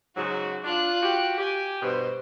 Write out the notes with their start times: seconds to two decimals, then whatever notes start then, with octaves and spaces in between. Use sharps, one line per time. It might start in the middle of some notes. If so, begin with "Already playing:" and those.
0.16 G#2 C#3 F#3 F#4
0.63 D4 F4 F#6
1.02 F#4 G4
1.38 G4 G#5
1.82 G2 B2 C5